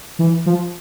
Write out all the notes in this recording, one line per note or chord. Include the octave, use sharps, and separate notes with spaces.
E3
F3